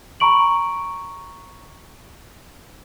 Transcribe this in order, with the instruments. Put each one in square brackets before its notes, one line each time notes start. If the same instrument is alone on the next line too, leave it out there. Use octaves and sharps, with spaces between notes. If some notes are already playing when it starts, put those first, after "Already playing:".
[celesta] A#5 B5 C#6 D7 F#7